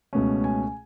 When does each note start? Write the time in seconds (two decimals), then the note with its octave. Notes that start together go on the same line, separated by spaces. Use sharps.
0.13 C#2 B2 A3 C#4
0.44 G#5